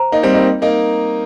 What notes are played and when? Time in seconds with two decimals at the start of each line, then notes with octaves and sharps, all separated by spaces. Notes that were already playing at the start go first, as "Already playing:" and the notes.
Already playing: C5 A#5
0.12 A#3 D#4
0.23 G3 C4
0.34 A#3 D#4
0.62 A#3 D#4